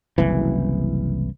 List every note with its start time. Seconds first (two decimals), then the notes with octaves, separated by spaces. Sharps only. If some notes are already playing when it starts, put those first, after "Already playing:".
0.18 F#1 C2 E3